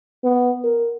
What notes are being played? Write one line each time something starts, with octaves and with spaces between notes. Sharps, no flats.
B3
A#4